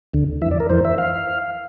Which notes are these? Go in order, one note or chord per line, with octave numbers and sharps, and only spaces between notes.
D2 D3
F2 E3 D5 E5
A#4
F2 E3 C5
E5
F5